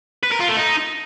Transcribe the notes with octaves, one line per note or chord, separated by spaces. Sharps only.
B4
A#4
F4
A3
D#4